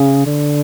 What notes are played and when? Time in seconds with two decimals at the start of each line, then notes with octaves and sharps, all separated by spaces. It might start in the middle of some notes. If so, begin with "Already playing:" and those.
Already playing: C#3
0.26 D3